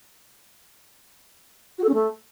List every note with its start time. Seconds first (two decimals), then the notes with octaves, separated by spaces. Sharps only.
1.78 F#4
1.84 A4
1.89 C#4
1.94 A3